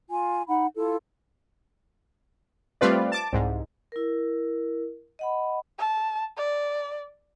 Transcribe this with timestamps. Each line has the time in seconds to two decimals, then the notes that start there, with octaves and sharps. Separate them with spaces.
0.10 F4 G#5
0.48 D#4 F#5 B5
0.76 E4 F4 A4
2.81 G3 A3 C4 F4 B4 D5
3.12 A5 D6
3.33 C2 G#2
3.92 E4 A#4
5.19 D#5 F#5 B5
5.78 A5
6.37 D5